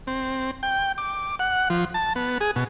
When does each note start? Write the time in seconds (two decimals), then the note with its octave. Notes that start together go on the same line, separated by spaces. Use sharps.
0.07 C4
0.63 G5
0.98 D6
1.39 F#5
1.70 F3
1.94 A5
2.16 B3
2.41 G#4
2.56 B2